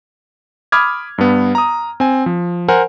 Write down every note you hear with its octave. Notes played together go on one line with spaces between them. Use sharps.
B5 D6 D#6 F6 G#6
G2 B3
A#5 D#6
C4 G#5
F3
A#4 C5 F#5 G#5